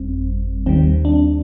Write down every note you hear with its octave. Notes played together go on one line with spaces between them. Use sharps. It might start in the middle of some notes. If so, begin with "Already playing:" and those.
Already playing: G1 F2 G3 C4
D#2 D#3 G3 C4
D4